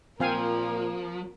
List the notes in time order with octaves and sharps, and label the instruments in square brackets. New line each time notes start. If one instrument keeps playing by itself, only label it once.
[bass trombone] A#2 [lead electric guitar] F3 [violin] A#3 [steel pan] C4 F5 G#5